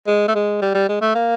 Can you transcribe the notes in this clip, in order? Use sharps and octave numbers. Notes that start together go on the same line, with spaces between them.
G#3
A3
G#3
G3
G3
G#3
A3
A#3